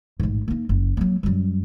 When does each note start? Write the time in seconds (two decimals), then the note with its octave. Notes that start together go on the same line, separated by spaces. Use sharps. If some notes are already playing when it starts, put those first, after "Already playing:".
0.20 A1 G#2
0.48 A#3 D#4
0.69 F#1
0.97 F#3 A#3
1.23 F#2 G3